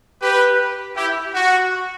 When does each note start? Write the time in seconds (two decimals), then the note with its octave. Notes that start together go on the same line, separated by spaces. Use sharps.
0.21 G4 B4
0.96 E4 G4
1.34 F#4